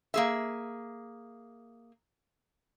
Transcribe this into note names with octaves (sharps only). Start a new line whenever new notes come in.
A#3 G#4 E5